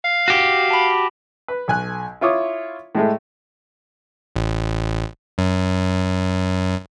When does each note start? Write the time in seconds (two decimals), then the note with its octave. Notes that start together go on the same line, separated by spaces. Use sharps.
0.04 F5
0.28 F#4 G4
0.71 A5 B5
1.48 B4
1.68 B1 G#5 F#6
2.21 E4 F4 C#5 D6 D#6
2.95 A2 G#3 A3
4.36 A1
5.38 F#2